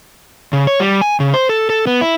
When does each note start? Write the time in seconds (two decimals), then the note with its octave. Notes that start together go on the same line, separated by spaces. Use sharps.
0.53 C#3
0.67 C#5
0.80 G3
1.02 G#5
1.20 C#3
1.34 C5
1.49 A4
1.70 A4
1.87 B3
2.01 E4